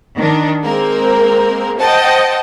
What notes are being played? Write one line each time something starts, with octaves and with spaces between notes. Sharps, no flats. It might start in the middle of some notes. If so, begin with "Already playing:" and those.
D#3 D4
G#3 A#3 C4 A#4
C5 D#5 F#5 G5 A5